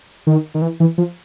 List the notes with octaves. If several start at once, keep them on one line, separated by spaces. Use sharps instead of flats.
D#3
D#3
E3
E3
F3